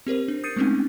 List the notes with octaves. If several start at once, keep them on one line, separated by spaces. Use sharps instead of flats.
C4 G4 A#4 C5
D4
D#6 G6 A6 C7 C#7 D#7
G#3 A3 C4 C#4 D#4